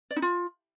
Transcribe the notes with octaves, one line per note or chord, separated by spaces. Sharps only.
D5
D#4
F4